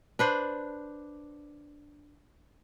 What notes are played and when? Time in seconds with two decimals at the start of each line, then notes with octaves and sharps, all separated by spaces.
0.19 D4 B4 C5